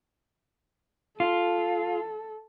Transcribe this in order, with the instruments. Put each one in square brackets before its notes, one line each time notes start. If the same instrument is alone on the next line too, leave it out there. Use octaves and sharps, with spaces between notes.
[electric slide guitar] F4 [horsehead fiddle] A4